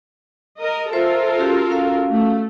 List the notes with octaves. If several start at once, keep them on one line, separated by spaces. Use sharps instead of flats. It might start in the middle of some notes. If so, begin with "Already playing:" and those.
A#4 D#5
F4 A4 A#4 C5 E5
C#4 F#4 G4
C#4 F#4 F5
A3